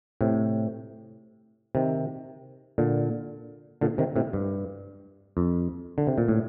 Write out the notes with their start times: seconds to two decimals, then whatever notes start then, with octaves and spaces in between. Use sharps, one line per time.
0.21 A2 C3
1.75 C3 D#3
2.78 A#2 D3
3.81 A#2 D3
3.98 C3 D#3
4.16 A2 C3
4.33 G2
5.37 F2
5.98 D3
6.07 C3
6.18 A#2
6.28 A2